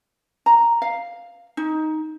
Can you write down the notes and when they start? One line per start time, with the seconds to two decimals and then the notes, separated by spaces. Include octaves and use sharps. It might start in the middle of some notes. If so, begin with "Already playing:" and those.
0.46 A#5
0.82 F5
1.57 D#4